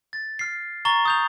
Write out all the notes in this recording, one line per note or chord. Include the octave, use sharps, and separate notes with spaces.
A6
F6 C7
A#5 C#6 A6 G7
D#6 G6 F7